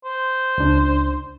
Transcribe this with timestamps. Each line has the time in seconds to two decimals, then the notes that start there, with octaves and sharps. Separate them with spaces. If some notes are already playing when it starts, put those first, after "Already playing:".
0.05 C5
0.58 C#2 D4